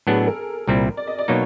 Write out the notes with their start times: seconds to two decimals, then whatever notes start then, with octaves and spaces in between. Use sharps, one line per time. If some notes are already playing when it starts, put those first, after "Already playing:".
0.07 A2 F#3 B3 D4 G#4
0.17 A4
0.27 A#4
0.67 C2 A#2 G3 C4 E4
0.97 D5
1.07 D#5
1.19 D5
1.28 B2 F#3 A#3 D#4 C#5